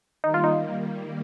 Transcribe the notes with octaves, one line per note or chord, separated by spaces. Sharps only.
D#3 G3 A#3 D#4
F4
D#4